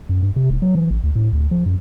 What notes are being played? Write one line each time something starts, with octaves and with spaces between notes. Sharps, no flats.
F#2
G2
C3
D1
F#3
E3
A1
D2
A2
D2
F3
F#2